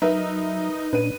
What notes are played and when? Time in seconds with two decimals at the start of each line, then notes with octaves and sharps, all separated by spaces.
0.02 F#3 D#4 A#4 B4 E5
0.93 A#2 C#4 D4 B4 D#7